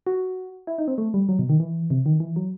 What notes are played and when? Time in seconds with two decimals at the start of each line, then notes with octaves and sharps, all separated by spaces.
0.07 F#4
0.67 E4
0.78 D#4
0.88 C4
0.98 A3
1.14 G3
1.29 F#3
1.39 B2
1.49 D#3
1.60 E3
1.90 C3
2.06 D#3
2.20 E3
2.36 F#3